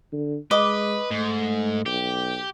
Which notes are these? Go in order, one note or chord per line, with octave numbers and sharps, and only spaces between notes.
D3
G#3 B4 D#5 D6
G#2 A3
B1 G4